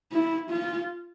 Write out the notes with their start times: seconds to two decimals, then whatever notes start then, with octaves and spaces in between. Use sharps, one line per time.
0.12 E4
0.51 F4